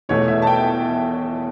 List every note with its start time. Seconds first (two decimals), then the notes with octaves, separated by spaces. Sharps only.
0.09 E1 E2 B2 A3 C#5
0.28 E5
0.42 A5
0.47 G5